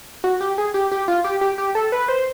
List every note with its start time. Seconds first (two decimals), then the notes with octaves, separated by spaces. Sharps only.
0.24 F#4
0.41 G4
0.58 G#4
0.74 G4
0.92 G4
1.08 F4
1.24 G4
1.41 G4
1.58 G4
1.75 A4
1.92 B4
2.08 C5